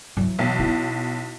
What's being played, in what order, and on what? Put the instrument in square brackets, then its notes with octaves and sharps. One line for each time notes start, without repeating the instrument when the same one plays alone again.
[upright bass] E3 F#3
[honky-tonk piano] B1
[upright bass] E4